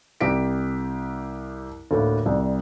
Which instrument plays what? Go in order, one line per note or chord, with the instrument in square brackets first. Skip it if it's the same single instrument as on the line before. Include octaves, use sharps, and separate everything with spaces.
[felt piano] C2 G4 B6 D7
D2 A2 A#3
C2 G3